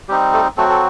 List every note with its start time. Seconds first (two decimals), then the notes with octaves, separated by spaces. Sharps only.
0.08 G3 C4 D#4 G4
0.33 A3 A4
0.57 F#3 A3 C4 F#4 A4
0.70 A4